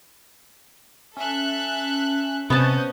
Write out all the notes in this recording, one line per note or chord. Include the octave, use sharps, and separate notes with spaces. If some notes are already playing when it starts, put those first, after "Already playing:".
C#4 A4 E5 F#6
C3 B3 C#4 C5 D#5 A5